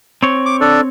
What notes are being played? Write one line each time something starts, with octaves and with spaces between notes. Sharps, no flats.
C4 C#5
D6
D4 A4 D5